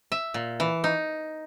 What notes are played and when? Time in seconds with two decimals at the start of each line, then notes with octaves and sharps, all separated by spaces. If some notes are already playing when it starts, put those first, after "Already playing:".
0.12 E5
0.34 A#2
0.60 E3
0.84 D#4